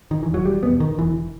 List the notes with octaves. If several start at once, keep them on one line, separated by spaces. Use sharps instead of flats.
D#3
E3
E1
F#3
G3
E2 B2 B3
D#3
E1 E3